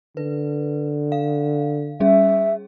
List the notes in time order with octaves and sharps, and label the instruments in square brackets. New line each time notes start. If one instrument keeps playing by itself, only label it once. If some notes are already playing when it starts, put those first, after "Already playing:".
[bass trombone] D3 [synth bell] B4
[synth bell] F5
[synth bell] G3 C#4 G#4 [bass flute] E5